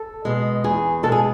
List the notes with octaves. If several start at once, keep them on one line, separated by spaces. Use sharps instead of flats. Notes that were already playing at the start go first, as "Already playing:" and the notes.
Already playing: A4
B2 G#3
E2 G#4
B2 G#3 A4
G#4